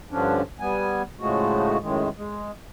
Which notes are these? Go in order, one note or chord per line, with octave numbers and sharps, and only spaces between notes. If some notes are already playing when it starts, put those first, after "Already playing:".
G2 D3 F3 C#4 D4
G3 B3 G#5
A2 C#3 F3 G#3 A3 F#4
F#2 A2 D#3 G#3
G#3